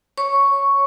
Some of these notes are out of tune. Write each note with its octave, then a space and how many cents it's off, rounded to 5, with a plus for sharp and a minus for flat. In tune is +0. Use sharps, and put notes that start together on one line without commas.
C#5 +0 C#6 +0